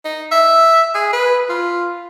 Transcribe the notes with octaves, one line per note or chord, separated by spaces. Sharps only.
D#4
E5
G#4
B4
F4